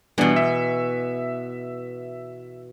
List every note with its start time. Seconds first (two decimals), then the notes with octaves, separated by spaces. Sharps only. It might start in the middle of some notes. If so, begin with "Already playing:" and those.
0.18 B2 E3 G3 B3 D4
0.36 E5